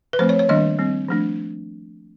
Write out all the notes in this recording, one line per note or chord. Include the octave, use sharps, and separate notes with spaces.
B4
F3 A3 C4 C5
C#5
C#5
D#3 G3 A#3 D4 D#5
G3 C4
F3 A3 D4